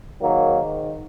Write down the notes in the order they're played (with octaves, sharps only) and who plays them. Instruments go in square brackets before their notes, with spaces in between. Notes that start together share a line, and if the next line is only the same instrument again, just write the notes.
[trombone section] G#2 D#3 F#3 A#3